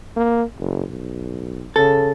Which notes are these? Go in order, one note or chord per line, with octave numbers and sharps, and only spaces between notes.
A#3
F#1
B1
C#3 A4